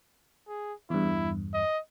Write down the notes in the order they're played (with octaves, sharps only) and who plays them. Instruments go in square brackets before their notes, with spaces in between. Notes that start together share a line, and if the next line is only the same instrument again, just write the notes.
[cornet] G#4
[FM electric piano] E2 G2 [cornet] E4
[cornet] D#5